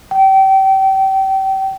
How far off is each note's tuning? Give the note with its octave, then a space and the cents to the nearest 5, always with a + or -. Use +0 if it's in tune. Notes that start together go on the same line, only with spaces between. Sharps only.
G5 -30